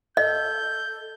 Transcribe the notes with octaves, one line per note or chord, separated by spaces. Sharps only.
A4 D#5 G6